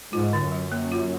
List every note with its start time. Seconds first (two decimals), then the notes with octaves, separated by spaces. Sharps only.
0.13 G#2 F4
0.33 D3
0.43 F#2
0.52 F#3
0.72 A#3
0.92 F4